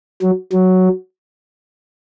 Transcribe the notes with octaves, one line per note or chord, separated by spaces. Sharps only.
F#3
F#3